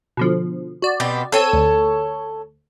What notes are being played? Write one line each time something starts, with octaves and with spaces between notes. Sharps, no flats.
B2 D3 F3
F#4 D5
B2 C4 G4
C4 A4 C#5 E6 D#7
D2